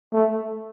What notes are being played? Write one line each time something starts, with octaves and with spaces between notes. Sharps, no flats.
A3